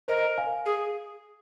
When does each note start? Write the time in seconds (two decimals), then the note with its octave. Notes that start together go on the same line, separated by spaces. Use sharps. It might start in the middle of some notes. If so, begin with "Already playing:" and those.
0.08 A#4 C5 D#5
0.38 F5 G#5
0.66 G#4